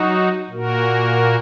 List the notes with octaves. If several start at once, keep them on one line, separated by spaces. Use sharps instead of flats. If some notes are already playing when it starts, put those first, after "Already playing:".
Already playing: F#3 D#4 F#4
A#2 A#3 F#4 A#4